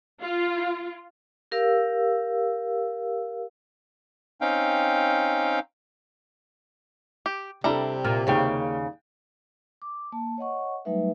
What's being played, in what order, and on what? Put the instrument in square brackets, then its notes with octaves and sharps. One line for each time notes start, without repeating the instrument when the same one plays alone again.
[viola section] F4
[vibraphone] G4 A#4 F5 E6
[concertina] C4 C#4 D#4 F5 G5
[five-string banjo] G4
[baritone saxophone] C3 [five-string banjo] G3 E4 A#5 [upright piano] D4 A4
[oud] A#2 [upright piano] F6
[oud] D#2 C#3 [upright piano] A#3 G5
[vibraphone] D6
A#3 A5
C#5 D#5 F#5 C#6
F#3 G3 A3 D#4 B4 E5